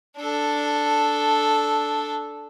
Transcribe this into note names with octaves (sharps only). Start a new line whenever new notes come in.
D4 A4